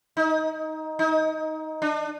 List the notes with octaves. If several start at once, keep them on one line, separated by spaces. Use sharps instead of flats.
D#4
D#4
D4